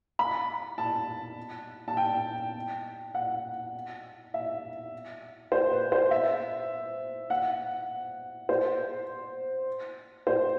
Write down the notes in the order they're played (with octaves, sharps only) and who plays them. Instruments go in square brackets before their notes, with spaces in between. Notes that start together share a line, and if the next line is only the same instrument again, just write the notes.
[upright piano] B5
A5
A5
G5
F#5
E5
C5
B4
C5
E5
F#5
C5
C5